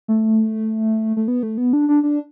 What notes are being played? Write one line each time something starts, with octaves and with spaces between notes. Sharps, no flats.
A3
A3
B3
A3
B3
D4
D4
D4